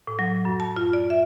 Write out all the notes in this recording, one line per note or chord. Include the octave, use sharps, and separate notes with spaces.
A2
F#3
F#2
A5
F4
D5
E5